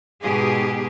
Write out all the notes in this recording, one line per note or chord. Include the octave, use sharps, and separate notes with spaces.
G#2 B2 G4 G#4